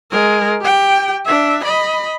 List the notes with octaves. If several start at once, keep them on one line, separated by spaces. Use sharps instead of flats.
G#3 A#4
G4 G5
D4 E5
D#5 B5